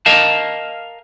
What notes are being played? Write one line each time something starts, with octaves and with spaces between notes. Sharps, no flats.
A#4 D#5 F5 A5